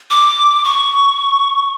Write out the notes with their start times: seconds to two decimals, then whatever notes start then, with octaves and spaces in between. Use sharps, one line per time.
0.11 D6
0.64 C#6